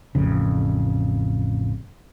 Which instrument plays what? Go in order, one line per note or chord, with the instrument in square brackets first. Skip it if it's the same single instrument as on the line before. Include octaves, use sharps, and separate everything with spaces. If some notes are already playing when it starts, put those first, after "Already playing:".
[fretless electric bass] A1 F2 C#3